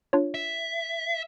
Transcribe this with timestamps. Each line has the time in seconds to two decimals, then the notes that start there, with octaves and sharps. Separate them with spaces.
0.13 D4 F4 C#5
0.34 E5